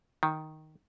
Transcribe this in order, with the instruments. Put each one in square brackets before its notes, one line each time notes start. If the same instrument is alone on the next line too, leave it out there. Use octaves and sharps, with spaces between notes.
[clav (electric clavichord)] D#3